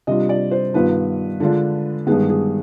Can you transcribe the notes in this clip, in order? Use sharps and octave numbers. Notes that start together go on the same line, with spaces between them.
C3 G3 D4 F4 D#5
D5
C5
G2 D#3 B3 F4 B4
D3 G#3 D4 F4
G2 D#3 G#3 B3 G#4
G#4